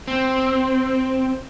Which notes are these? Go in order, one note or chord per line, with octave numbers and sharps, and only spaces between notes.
C4